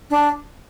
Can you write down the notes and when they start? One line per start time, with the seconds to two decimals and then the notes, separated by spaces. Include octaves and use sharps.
0.10 D4